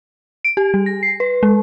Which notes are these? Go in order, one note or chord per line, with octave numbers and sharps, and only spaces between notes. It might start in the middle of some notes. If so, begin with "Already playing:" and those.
D7
G4
G3
A#6
C7
B4
G#3